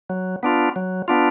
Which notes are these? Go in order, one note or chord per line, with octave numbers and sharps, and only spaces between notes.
F#3
B3 D4 F4
F#3
B3 D4 F4